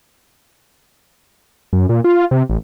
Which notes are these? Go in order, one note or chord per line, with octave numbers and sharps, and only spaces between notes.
F#2
A#2
F4
C3
A1